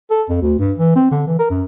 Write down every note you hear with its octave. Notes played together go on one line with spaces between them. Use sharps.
A4
F2
D2
G2
E3
C4
D3
E3
A#4
F#2